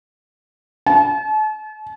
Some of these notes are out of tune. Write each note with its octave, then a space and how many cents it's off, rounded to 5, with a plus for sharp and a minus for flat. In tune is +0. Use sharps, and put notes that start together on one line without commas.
A5 -40